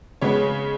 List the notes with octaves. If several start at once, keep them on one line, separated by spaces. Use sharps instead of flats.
C#3 G#3 B3 C#5